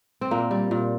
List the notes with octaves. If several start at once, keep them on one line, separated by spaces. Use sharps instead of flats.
C4
A#2 A#3
G3
A#2